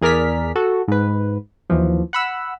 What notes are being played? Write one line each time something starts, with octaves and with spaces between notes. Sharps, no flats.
E2 G#4 A#4 D5 F6 B6
F#4 A4
G#2 B4
D#2 E3 F3
F#5 B5 E6